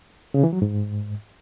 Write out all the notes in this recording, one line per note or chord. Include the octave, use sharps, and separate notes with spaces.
C#3
E3
F#3
G#2